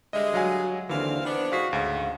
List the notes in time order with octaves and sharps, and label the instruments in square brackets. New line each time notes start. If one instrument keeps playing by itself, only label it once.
[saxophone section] D3 G3 G#3 [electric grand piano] D#5 E5
[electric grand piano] F#3 F5 G#5 [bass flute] F#4
[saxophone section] D#2 C4 F5 [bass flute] D3 [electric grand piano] E3
[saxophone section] B3 D4 [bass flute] C5
[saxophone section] G#3 D#4 F#4 [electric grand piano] F5 B6 C7
[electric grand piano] D2 [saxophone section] G#2 C#3 [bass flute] F5